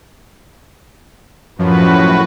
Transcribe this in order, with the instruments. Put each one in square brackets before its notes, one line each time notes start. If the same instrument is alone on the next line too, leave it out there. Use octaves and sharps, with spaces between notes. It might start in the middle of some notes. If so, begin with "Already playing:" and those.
[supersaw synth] F#2 F3 [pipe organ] A2 F#4 B4